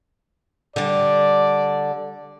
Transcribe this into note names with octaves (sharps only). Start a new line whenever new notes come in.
D3 G3 D5